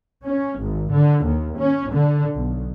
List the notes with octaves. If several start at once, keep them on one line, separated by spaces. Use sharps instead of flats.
C#4
G#1
D3
D#2
C#4
D3
B1